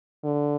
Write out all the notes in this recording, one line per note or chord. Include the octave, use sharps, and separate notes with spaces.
D3